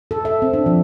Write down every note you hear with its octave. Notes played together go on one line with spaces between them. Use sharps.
A4
E5
C4
D4
F3